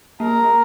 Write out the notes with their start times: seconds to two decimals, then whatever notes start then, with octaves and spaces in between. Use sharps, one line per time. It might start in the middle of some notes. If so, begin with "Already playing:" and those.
0.20 A#3 A#4